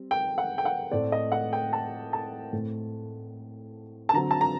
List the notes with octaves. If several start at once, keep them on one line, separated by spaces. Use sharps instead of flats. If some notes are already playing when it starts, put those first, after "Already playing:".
Already playing: G3 C4
G5
F#5
G5
F#5
A2 A3 C4 D5
D#5
F#5
G5
A5
A5
A2 A3 C4
A5
D3 F#3 C4 A#5
A5
A#5